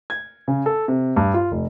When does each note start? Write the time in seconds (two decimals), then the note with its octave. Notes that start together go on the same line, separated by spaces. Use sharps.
0.10 G#6
0.48 C#3
0.66 A4
0.88 C3
1.17 G2
1.34 F4
1.51 F1